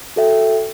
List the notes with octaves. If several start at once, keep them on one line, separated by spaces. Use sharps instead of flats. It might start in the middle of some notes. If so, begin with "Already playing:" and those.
F#4 A4 E5 G5